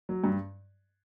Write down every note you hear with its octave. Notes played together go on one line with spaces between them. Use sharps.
F#3
G2